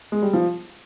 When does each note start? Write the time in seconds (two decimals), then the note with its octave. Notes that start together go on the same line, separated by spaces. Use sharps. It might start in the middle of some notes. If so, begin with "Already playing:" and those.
0.12 G#3
0.22 G3
0.33 F3